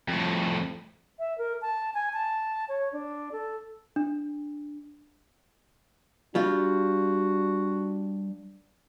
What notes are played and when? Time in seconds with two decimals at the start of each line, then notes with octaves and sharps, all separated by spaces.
0.09 F2 A2
1.19 E5
1.38 A#4
1.61 A5
1.94 G#5
2.13 A5
2.69 C#5
2.93 D4
3.32 A4
3.96 D4
6.35 G3 D4 F4 F#4